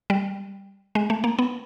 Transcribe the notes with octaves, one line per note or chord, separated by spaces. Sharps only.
G3
G#3
A3
A#3
B3